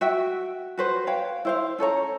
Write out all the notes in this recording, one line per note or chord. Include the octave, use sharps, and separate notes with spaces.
F#4 E5 G5
F#4 B4 C5
C#5 F5 G5
E4 C5 F5
C#4 A4 C#5 A#5